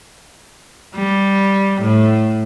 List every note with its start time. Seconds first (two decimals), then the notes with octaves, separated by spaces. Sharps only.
0.96 G3
1.82 A2